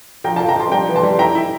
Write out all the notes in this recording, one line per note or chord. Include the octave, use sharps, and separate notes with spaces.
F3 G5 A#5
F3 F5 A5
G5 A#5
F3 A5 C6
G3 G5 A#5
E3
A5 C6
G3
E4 G5 A#5
E4